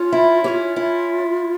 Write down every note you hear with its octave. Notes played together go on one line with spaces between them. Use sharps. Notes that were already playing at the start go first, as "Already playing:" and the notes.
Already playing: C#4 F4
E4
C#4 F4 G4
E4